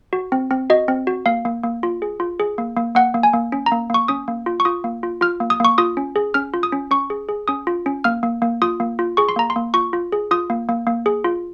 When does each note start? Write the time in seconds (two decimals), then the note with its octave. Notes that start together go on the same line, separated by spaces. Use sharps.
0.13 F#4
0.32 C4
0.51 C4
0.70 F#4 D#5
0.88 C4
1.07 F#4
1.26 A#3 F5
1.45 A#3
1.63 A#3
1.83 F4
2.02 G#4
2.20 F4
2.40 G#4
2.58 A#3
2.77 A#3
2.95 A#3 F#5
3.14 A#3
3.23 G#5
3.33 A#3
3.52 C#4
3.66 A#5
3.72 A#3
3.90 A#3 C#6
4.08 C#4 D#6
4.28 A#3
4.46 F4
4.60 C#6
4.65 F4 D#6
4.84 A#3
5.03 F4
5.21 F4 F6
5.40 A#3
5.50 D#6
5.60 A#3 C#6
5.78 F4 D#6
5.97 C#4
6.16 G#4
6.34 C#4 F6
6.54 F4
6.63 D#6
6.72 C#4
6.91 C#4 C#6
7.10 G#4
7.29 G#4
7.48 C#4 D#6
7.67 F4
7.86 C#4
8.04 A#3 F6
8.23 A#3
8.42 A#3
8.62 F4 D#6
8.80 A#3
8.99 F4
9.17 G#4 C#6
9.29 C6
9.36 A#3 A#5
9.50 C6
9.56 A#3
9.74 F4 C#6
9.93 F4
10.12 G#4
10.31 F4 D#6
10.50 A#3
10.69 A#3
10.87 A#3
11.06 G#4
11.24 F4